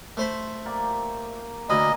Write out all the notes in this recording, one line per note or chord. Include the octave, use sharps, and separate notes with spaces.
A3 C5 B5
A#3 G4 D5
D2 A#3 D#5 G#5 B5